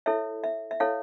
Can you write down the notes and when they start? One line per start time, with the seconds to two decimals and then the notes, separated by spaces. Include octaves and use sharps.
0.06 E4 A4 C#5 E5
0.44 E5
0.71 E5
0.80 E4 A4 C#5 F5